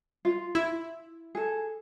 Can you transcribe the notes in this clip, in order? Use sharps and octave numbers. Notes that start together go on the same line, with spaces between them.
F4
E4
G#4 A4